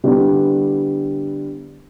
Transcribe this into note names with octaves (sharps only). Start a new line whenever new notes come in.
D3 G3 B3 E4 G4